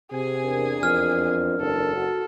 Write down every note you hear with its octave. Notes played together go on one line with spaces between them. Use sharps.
C3 G#4 G#5
E2 D4 A#4
F2 F6
F#1 A4
F#4